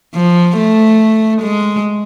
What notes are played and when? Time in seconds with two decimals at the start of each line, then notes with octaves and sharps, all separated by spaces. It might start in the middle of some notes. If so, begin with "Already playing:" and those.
0.14 F3
0.57 A3
1.41 G#3